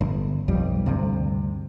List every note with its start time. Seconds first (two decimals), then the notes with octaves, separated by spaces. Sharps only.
0.01 G1
0.48 B1 F2 G3
0.86 D2 G2 C3